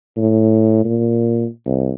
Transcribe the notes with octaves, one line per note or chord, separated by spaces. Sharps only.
A2
A#2
C2